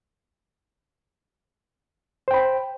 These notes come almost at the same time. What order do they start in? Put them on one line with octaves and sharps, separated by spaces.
C5 G5 B5